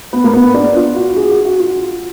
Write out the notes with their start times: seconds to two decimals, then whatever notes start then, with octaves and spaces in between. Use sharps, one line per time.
0.13 B3
0.24 A#3
0.33 B3
0.54 D4
0.75 F4
0.96 F#4
1.16 G#4
1.31 F#4
1.45 F#4
1.59 F4